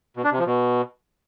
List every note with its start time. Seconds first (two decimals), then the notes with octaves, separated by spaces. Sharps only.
0.17 B2
0.24 D4
0.32 C3
0.39 F3
0.47 B2